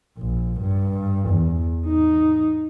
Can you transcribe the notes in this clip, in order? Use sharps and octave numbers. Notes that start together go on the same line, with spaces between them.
A#1
G2
E2
D#4